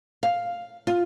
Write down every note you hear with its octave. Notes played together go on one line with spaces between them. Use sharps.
F5
F4